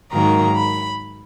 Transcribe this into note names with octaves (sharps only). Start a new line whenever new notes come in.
G#2 D#3 F#3 A#3 A#5
B5